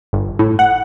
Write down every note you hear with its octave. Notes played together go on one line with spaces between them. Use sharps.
G1
A2
F#5